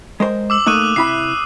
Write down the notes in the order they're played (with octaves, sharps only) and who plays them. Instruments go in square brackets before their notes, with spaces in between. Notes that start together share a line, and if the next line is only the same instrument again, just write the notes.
[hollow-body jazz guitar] G#3 A#4 C5
[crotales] D6 E6 F#7
[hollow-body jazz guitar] A3 A#3 D#4 [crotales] D#6 F#6 D#7
[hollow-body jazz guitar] C3 E4 B5 [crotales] C7